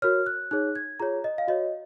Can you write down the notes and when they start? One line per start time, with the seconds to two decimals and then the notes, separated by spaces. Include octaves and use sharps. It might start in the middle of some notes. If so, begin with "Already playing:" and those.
0.02 F#4 A#4 C#5 F6
0.26 F#6
0.51 D#4 G#4 C#5 F#6
0.76 G#6
1.00 F4 G#4 C#5 A#5
1.24 D#5
1.38 F5
1.48 F#4 C#5 D#5